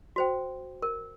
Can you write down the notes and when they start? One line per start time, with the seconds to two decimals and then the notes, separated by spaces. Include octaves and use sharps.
0.16 F#4 C5 G5
0.82 A#4